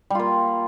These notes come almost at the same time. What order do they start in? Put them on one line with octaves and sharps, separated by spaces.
G3 F4 A#3